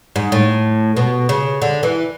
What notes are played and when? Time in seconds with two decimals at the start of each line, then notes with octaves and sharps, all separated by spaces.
0.16 G#2
0.32 A2
0.97 B2
1.29 C#3
1.62 D3
1.83 E3